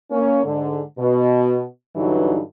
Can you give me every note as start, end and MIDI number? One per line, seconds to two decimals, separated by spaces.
0.11 0.40 58
0.11 0.40 61
0.45 0.81 44
0.45 0.81 50
0.98 1.63 47
1.96 2.39 43
1.96 2.39 50
1.96 2.39 52
1.96 2.39 54
1.96 2.39 63